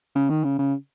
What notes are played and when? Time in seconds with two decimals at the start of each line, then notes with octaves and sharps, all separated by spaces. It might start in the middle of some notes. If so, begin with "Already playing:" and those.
0.15 C#3
0.30 D#3
0.44 C#3
0.59 C#3